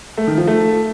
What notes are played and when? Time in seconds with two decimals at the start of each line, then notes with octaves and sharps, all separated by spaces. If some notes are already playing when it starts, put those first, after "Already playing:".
0.17 A3
0.27 D#3
0.37 F3
0.47 A3